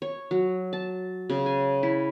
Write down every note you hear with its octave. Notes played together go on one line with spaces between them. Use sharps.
C#5
F#3
A5
C#3
G#5
E4